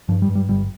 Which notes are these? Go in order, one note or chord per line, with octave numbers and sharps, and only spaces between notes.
G2 F3
G3
G2
G3
G1 G3